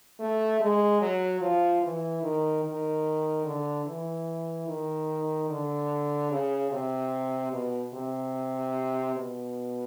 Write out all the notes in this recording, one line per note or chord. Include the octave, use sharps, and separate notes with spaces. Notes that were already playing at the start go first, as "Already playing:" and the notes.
A3
G#3
F#3
F3
E3
D#3
D#3
D3
E3
D#3
D3
C#3
C3
B2
C3
B2